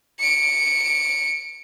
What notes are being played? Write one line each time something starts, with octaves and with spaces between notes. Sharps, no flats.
C#7 D7